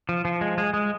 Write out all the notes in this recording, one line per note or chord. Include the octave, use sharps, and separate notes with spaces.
F3
F3
G#3
G#3
G#3